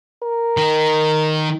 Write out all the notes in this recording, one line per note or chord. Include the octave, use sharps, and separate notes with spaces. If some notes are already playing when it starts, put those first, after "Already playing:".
A#4
D#3